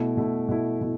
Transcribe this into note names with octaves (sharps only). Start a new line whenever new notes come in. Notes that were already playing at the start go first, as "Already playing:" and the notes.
Already playing: B2 A3 E4
B2 A3 E4
B2 A3 E4
B2 E4